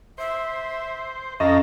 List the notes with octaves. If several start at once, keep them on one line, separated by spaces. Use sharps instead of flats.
C5 E5
F2 C#4 A4 D#5 F5 A#5